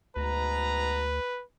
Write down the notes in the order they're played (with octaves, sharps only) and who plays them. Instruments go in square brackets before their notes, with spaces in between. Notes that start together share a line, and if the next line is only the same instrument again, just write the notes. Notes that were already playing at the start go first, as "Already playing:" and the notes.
[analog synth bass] D2 [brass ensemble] G#2 B2 A#5 [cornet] B4